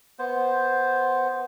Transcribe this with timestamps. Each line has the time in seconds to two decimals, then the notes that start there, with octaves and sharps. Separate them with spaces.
0.19 B3 C5